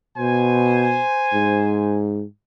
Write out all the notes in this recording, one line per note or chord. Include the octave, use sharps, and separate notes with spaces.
B2 C5 G#5
G#2